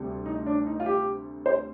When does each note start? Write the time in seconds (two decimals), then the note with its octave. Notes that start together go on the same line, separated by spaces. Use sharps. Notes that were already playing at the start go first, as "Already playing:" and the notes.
Already playing: D2 C3 G3
0.26 D#4
0.46 D4
0.66 D#4
0.80 F4
0.86 G4
1.46 C5